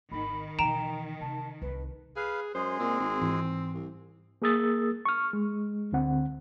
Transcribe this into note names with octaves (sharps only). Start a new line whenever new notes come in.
G#1 D#3 B5
B2 E3 G5 A#5 D7 E7
C3 A5
C2 B4
G#4 B4 F5
F#2 G#3 G#4 C5
A#2 C4
G#1
G#2 E3
C2
A#3 G#4 A#4 D#6 E6 A6
C#6 F6
G#3
D2 D3 C4 F#5